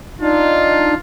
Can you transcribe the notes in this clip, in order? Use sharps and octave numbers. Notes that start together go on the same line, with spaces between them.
D4 D#4 F4